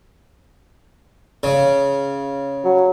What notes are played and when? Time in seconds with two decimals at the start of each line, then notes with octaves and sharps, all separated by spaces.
1.43 C#3
2.65 F#3